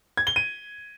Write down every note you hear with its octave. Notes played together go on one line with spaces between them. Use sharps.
G#6
G7
D#7